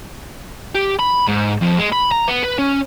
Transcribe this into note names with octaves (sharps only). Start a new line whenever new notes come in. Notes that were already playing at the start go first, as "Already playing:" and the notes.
G4
B5
G#2
F2
G#3
B5
A#5
B3
B4
C#4